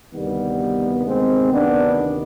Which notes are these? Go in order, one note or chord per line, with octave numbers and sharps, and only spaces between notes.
D2 C3 D#3 G3 B3
G#3 C4
B3 D4